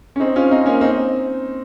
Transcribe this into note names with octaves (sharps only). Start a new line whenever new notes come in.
C#4
C4 D#4
C#4 F4
C4 D#4
A#3 C#4
C4 D#4